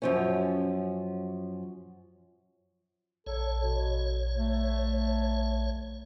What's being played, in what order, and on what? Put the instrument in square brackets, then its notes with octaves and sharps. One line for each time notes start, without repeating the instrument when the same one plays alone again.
[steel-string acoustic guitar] F#2 F3 C#4
[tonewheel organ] A#1 C#5 [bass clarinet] A4
[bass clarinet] B2
A3